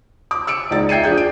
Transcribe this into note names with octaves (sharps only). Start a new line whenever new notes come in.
D6
E6 C#7 D7
C#2 D#4 D5 A6
E5 G5 G#6 C7 C#7 D#7
F3 D4 G#4 G6 C#7
D7